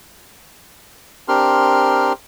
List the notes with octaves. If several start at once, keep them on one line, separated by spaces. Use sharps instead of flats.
C4 D4 G4 A#4 C6 F6